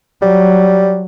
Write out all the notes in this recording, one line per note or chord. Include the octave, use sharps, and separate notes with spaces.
F#3 G3